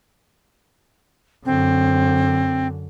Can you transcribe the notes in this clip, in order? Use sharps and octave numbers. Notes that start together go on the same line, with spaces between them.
F#2 D3 C4